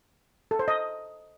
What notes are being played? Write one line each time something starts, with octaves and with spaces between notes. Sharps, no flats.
A4
C5
D#5